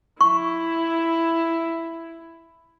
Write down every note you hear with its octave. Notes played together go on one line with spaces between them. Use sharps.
E4 C#6